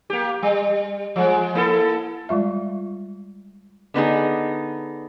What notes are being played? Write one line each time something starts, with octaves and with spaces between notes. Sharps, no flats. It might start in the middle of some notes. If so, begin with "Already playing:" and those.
A#3 G4
G3
F3 G#3
A#3 E4 A4
G3 G#3 F4 E5
D3 B3 D#4 G#4